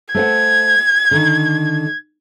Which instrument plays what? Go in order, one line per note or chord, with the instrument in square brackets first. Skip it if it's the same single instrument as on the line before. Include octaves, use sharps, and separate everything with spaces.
[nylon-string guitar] A3 C5 F#5 [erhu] G#6
[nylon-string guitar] D3 D#3